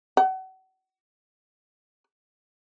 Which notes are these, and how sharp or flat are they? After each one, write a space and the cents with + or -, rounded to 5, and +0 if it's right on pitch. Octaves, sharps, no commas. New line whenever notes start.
F#5 +35